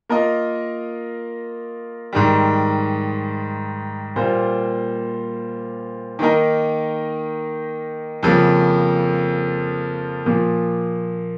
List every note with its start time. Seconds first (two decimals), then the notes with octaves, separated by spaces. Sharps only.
0.10 A#3 F4 A#4 D#5
2.13 G#2 D#3 G3
4.16 A#2 G3 A#3 F4 C5
6.19 D#3 A#3 D#4 A#4
8.23 F2 C#3 F3 A#3
10.26 A#2 F3 A#3